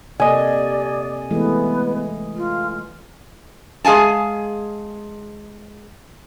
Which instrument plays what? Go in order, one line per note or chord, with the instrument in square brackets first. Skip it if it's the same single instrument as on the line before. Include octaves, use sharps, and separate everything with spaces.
[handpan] C3 A#3 A4 [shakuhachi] D5 [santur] D#5 G#5
[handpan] E3 G#3 A3 [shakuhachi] B3
[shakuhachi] F4
[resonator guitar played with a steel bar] G#3 G#4 F5 G#5 A5